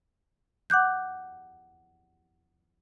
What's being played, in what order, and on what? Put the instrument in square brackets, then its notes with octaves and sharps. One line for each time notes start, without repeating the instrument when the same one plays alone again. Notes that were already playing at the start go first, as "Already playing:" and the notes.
[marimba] F#5 D6 F#6 G6